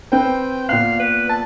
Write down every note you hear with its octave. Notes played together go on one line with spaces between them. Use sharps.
C4 B4 C5 G5
A#2 B3 F5 F#6
B4
A5